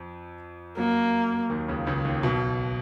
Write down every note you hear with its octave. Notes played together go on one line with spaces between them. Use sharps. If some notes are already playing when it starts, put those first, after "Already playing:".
Already playing: F2 F3
F#2 F#3 A#3
D#2 D#3
C#2 C#3
C#2 C#3
D#2 D#3
B1 B2